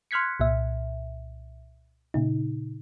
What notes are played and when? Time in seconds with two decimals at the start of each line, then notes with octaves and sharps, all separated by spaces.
0.11 C6 F6 F#6 G#6 B6 C#7
0.40 C2 A#2 E5
2.14 A#2 C#3 D#4